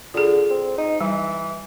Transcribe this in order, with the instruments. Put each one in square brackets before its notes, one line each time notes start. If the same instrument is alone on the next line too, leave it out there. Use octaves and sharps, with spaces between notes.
[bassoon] D3 [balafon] F4 G#4
[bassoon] C4
D#4
[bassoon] E3 [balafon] G3